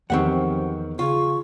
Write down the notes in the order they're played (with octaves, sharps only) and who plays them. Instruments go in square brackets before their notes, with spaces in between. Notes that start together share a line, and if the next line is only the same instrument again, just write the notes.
[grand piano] E2 D#3 C#6 [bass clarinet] F3 [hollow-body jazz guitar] C4 G4 F#5
[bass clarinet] C#3 [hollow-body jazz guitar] F4 [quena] C#6